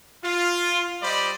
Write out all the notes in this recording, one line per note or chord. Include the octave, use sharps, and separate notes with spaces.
F4
G3 C5 D5 D#5 B5